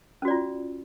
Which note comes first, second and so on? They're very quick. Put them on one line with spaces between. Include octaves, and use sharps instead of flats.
C#4 F#4 D5 F4